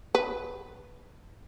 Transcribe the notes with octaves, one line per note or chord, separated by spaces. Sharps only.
B4